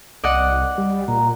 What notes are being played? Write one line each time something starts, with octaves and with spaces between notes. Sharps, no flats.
C2 D5 D#5 F#5
G3
A#2 A#5